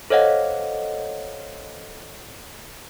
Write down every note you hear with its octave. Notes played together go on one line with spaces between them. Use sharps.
A4 C5 C#5 D#5 F5 F#5